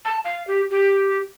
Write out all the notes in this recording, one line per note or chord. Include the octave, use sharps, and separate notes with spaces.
A5
F5
G4
G4